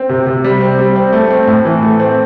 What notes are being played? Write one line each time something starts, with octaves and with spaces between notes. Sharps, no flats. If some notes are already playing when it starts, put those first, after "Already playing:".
Already playing: C4
C3
C3
G3
C4
G3
C4
A3
C4
A2
E3
A3
C4